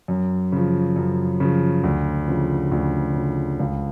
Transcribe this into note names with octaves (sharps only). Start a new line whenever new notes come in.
F#2
C#3 F3
F#2
C#3 F3
D2
C#3 F3
D2
C#3 F3
C#2